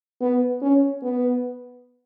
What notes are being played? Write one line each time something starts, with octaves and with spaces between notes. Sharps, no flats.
B3
C#4
B3